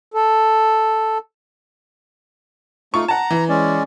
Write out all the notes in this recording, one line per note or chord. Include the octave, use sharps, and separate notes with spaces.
A4
A3 D#4 F4 C#6
F#5 A5 A#5
E3
G#3 C#4 D5